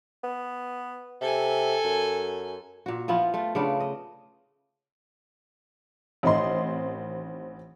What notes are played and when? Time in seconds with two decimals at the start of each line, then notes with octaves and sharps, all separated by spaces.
0.24 B3
1.21 C3 A4 G#5
1.84 F#2
2.86 A#2 F#4
3.08 F3 B3 E4 F4
3.34 A3 F4
3.55 C#3 B3 D4 F4
3.80 D#5
6.23 A1 D#3 C4 D#5 C6